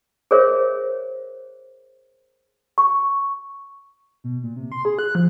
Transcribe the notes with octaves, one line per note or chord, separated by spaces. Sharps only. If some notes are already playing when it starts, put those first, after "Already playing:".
G#4 A#4 C5 C#5 E5
C#6
B2
A#2
C3
C6
G#4
F#6
F3